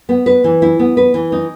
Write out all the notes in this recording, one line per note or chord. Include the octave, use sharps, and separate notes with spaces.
B3
B4
E3
E4
B3
B4
E3
D#4